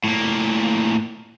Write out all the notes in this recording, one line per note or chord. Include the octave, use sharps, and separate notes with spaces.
A2 A#3